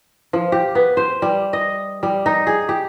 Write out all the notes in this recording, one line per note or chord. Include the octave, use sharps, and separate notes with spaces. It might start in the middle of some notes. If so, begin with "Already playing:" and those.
F3
G4
B3
C5
G3
D#5
G3
D#4
G#4
G4